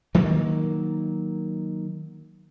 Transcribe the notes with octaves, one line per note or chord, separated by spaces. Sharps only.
D#3 F#3 A#3